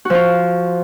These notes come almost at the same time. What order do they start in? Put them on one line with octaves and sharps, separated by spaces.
F#4 F3 F4